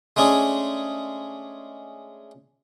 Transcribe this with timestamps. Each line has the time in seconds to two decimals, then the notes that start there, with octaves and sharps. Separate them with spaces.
0.16 G#3 A3 C#4 D4 G#4